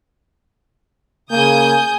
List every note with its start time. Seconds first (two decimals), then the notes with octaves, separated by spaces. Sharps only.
1.31 C#3 A#3 G#5 D#6 G6